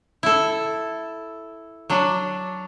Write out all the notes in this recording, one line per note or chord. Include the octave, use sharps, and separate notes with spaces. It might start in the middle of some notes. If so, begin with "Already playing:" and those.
E4 A4
F#3 D4